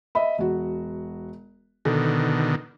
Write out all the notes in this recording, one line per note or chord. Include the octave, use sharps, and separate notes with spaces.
D#5 E5 B5
E1 F#4
B2 D3 D#3 A4